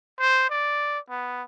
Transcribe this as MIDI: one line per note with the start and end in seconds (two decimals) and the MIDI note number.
0.20 0.48 72
0.50 0.99 74
1.10 1.43 59